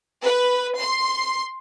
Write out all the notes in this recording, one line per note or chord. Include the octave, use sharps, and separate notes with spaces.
B4
C6